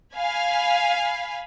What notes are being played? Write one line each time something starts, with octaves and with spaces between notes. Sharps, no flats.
F5 G#5 B5